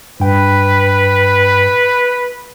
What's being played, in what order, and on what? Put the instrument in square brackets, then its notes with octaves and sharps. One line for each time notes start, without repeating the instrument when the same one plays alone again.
[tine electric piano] G2 G5 [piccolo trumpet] B4